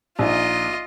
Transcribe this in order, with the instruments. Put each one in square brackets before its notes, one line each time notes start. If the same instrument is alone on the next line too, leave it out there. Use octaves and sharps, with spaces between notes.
[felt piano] A#1 D#4 [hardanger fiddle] F4 D#5